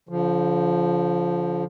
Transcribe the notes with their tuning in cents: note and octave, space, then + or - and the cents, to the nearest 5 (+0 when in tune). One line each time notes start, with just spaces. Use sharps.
D3 -40 F3 +0